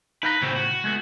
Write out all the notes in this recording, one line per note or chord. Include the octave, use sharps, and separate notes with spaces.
D#4 B4 F5 A#5
A2 C#3 C4 F#4
F#4
G#3 A3 B3